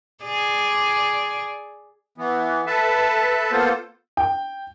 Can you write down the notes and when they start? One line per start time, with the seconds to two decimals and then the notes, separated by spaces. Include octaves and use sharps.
0.24 G#4 D5
2.18 E3 B3
2.67 A4 B4 E5 A5
3.52 A#3 B3 F4 A4 C5
4.17 G5